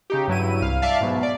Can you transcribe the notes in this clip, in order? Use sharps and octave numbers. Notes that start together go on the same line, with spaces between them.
C#3 D#4 G4
G2 F#3 E4 D#7
C2 F5
D5 E5 F5 A5
G#2 B2 F#3
D5